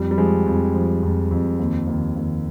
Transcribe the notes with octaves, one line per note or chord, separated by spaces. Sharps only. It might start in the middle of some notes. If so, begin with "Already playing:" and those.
Already playing: F2 G3
G3
F3 G#3
F2
F3
F2
F2
D#2
D#2
D#2